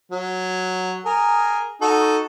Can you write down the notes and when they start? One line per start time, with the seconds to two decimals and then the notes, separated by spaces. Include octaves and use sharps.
0.12 F#3
1.06 G#4 A#4
1.82 D#4 F#4 A4